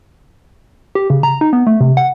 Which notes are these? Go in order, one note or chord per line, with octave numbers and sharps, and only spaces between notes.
G4
C#3
A#5
D#4
B3
A3
C3
F#5